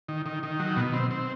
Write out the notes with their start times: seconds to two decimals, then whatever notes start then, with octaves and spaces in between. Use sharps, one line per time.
0.09 D#3
0.26 D#3
0.43 D#3
0.59 F#3
0.77 B2
0.94 C4
1.11 C4